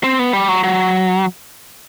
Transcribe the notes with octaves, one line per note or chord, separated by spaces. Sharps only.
C4
B3
G3
F#3
F#3